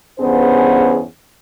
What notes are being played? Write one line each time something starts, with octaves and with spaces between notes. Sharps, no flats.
E2 G2 B3 C#4 G#4 C5